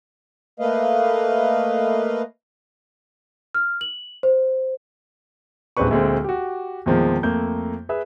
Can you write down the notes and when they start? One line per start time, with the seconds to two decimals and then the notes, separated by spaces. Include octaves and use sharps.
0.60 A3 A#3 B4 D#5 F5
3.54 F6
3.81 F#7
4.23 C5
5.77 D#1 G#3 C4 D4 B4 C#6
5.91 D2 A#2 G#3 A3 C4
6.24 F#4 G4
6.86 E2 A#2 D#3 F3 G#3 C4
7.23 F2 A3 A#3 G6
7.89 G#4 B4 E5